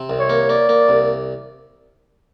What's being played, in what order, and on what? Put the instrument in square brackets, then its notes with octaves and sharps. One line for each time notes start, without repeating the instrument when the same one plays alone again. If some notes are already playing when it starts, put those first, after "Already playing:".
Already playing: [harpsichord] C3
C2
[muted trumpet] C#5
[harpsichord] A#3
[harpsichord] A#3 [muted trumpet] D5
[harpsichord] A#3
C2